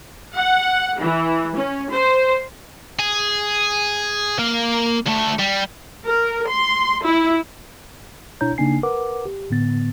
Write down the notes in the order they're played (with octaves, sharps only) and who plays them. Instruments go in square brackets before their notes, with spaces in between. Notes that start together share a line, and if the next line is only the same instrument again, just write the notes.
[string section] F#5
E3
C#4
C5
[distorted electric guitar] G#4
A#3 F5
D2 A3
G3
[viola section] A#4
C6
E4
[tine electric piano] B2 D4 E4 C#5 A#5 G6
C#3 A#3 D4 D#4 G#5 C7
A#4 B4 F#5 D6
G4
A2 D3 B3 A6